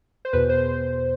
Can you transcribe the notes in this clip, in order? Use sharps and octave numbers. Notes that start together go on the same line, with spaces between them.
C5
E2 B2 B4
C5